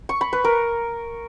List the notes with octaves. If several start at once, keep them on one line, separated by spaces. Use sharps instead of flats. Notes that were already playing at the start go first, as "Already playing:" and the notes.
C#6
B5
B4
A#4